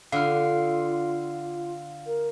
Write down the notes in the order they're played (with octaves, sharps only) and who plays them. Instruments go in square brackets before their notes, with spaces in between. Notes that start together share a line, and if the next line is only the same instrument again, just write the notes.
[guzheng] D3 [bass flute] F4 [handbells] F5 F#5 F6
[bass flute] A#4